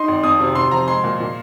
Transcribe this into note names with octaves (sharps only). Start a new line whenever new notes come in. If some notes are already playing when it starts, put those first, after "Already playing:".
Already playing: D#4 C6
G#1
F2 D#6
C3
C3 C6
F3 A#5
G#3 C6
A#2
A#2